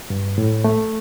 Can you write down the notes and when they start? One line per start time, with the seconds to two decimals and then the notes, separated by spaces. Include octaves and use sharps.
0.10 G2
0.38 A2
0.64 A3